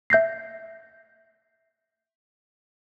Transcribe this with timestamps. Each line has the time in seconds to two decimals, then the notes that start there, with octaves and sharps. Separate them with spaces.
0.10 E5 G6 A#6 C7